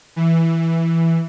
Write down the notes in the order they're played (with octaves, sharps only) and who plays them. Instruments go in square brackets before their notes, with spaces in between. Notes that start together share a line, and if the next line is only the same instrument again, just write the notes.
[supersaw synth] E3